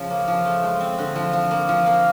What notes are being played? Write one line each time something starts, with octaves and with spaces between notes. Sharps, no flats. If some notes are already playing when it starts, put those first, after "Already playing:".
Already playing: C#3 F3
A#3
F3
A3
G#3
C4
D3
F3
F3
A#3
F3
A#3